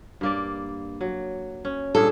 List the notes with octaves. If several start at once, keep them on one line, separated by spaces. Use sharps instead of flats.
G2 A#3 D5
F#3
C#4
G2 A#2 G#4 A4